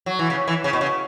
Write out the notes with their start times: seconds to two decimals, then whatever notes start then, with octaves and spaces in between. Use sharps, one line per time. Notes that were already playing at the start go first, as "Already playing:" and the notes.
0.06 F#3
0.19 E3
0.30 C#3
0.48 E3
0.64 C#3
0.73 B2
0.81 C#3